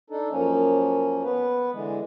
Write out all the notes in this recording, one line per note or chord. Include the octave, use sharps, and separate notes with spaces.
D4 D#4 A4
F#2 F3 A#3 C#4
B3 B4
D3 E3 G#3